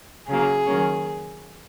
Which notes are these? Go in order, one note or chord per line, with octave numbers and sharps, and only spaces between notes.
C#3 F#3 A#3 G#4
D#3 F#3 A#3 C#4